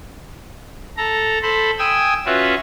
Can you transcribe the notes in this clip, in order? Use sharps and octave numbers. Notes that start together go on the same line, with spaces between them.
A4 A#5
A4 C5 B5
G5 G#5 D#6 E6
C#4 F4 F#4 B4 E5